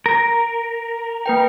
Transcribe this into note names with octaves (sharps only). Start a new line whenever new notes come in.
A#4 A#6
A#3 B4 G5